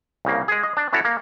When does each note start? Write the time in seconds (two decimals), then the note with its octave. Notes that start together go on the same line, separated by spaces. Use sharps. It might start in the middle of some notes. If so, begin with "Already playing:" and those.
0.25 C2 C#3 A#3
0.48 G#3 G#4
0.63 D#5
0.77 D4
0.93 C#4 E4 F#4 A4 C#5
1.05 A#3